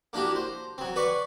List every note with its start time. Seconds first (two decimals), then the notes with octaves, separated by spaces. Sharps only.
0.13 A#3 D4 E4 F#4 G4
0.35 C5
0.78 F#3 C4
0.96 B4 D5 C#6